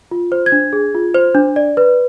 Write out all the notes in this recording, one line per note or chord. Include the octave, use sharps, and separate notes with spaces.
F4
C5
G#6
D4
G#4
F4
C5
D4
D5
B4